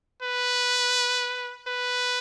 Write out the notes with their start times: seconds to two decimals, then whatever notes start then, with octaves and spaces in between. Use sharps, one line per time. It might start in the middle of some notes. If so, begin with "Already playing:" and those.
0.22 B4
1.67 B4